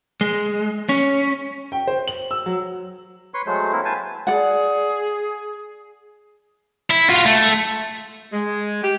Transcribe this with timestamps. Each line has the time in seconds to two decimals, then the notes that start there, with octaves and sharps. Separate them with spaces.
0.21 G#3
0.89 C#4
1.72 G5
1.87 C5
2.08 F#7
2.31 E6
2.46 F#3
3.34 B4 C#5 C6 C#6
3.47 F#3 G#3 A3 C5
3.72 A#3 C4 E4
3.85 B4 C5 G#5 A5
4.27 G#4 D5 F#5
6.90 E4
7.09 F4 F#4
7.26 A3
8.33 G#3
8.83 G4